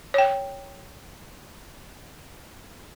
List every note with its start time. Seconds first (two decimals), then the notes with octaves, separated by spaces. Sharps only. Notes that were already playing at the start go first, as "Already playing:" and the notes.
0.14 C#5 G5